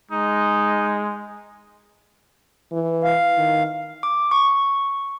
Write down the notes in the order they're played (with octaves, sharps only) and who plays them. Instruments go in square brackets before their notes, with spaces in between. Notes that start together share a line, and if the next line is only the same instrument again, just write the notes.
[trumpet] G#3 [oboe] D#4
[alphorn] E3
[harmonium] F5
[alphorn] D#3
[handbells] D6
C#6